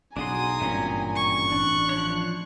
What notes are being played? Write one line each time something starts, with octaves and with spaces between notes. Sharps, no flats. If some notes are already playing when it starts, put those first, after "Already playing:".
B1 C#3 D4 F#4 G#5 A#5 C6 D#6
G#1 G2 A#2 E3 C4 C#4
C#6
A1 D4 F#6
F3 C#5